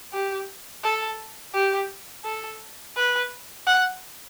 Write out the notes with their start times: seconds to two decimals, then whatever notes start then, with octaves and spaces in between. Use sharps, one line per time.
0.13 G4
0.84 A4
1.54 G4
2.25 A4
2.96 B4
3.67 F#5